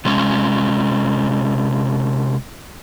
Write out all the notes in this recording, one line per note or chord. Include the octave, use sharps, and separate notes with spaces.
C3 G#3 C#4